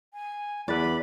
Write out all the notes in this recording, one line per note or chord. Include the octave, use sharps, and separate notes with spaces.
G#5
E2 B4 D5 B5